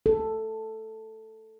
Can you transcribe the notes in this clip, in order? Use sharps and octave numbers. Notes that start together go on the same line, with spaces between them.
A4